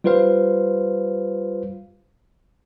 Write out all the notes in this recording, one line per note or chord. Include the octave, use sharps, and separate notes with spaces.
G3 F4 B4 C5 F5